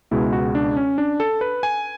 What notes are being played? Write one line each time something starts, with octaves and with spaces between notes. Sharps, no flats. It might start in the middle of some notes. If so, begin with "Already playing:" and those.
C#2 B2 G#3 E4
F#4
D4
C#4
D4
A4
B4
G#5